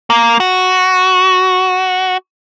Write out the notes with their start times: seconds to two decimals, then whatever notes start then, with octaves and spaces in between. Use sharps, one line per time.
0.10 A#3
0.40 F#4